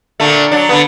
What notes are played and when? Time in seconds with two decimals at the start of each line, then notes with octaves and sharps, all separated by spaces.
0.20 A#2 D3 A3
0.51 F#3 D4
0.69 D3 B3